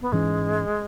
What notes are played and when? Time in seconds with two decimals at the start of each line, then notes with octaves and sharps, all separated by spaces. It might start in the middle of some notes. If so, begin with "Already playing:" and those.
0.01 B3
0.12 G#2 E3 G#3 C#4